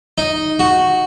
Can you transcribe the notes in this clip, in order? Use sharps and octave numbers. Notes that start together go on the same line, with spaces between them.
D#4
F#4